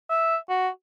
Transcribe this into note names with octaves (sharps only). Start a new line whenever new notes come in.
E5
F#4